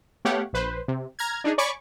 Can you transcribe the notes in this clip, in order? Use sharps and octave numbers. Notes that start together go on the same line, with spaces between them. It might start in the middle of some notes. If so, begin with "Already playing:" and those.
A3 B3 G4 C#5 F5 F#5
A#1 B4 C5
C3
A#5 F6 G#6
D4 D#4 G#4
C#5 D5 G#5 B5 C#6 D6